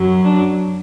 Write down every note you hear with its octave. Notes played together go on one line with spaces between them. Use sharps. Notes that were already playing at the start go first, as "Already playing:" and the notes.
Already playing: F#2 F#3
D4